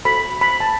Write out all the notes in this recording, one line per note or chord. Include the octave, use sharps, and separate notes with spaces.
F#4 A4 C5 B5
B5
A5